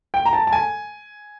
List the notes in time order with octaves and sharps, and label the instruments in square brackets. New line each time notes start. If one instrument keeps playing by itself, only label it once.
[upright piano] G5
A#5
A5
A5
G#5